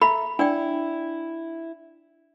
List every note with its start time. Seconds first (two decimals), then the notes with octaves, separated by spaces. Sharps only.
0.02 A4 E5 A#5 B5
0.39 D4 E4 D5 G5